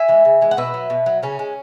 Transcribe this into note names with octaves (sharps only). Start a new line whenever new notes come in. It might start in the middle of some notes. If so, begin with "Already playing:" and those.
Already playing: E5 G#5
E3 G#3
C#3
E3 G#3
F#5
B2 B4 E5
F#3
B2
F#3
C#3 C#4
G#3